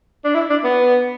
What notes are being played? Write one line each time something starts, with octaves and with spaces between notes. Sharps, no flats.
D4
E4
D4
B3